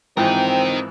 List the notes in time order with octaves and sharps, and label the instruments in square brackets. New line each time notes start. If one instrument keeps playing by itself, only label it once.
[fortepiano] G#2 E3 F3 [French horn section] C4 [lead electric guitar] D#4 A#4 [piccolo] G5